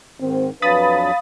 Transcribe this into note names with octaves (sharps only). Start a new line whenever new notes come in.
G#2 D#3 C4
F2 F#3 D4 B4 F5 B5 D#6 A6